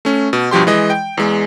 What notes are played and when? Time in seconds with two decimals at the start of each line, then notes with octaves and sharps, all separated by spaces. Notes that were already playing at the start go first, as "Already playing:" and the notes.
0.05 A3 C#4
0.33 B2
0.51 G2 B2 F3 G4 C6
0.67 E3 G#3 D#5
0.90 G5
1.17 E2 G#3